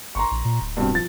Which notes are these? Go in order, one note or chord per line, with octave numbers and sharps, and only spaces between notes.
G1 A#5 C6 C#6
A#1
A#2
D1
G2 B2 C4
F3 A6